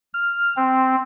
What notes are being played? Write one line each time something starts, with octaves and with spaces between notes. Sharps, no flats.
F6
C4